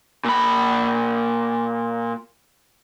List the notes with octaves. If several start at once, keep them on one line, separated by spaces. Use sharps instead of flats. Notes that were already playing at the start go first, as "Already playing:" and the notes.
A#2 B5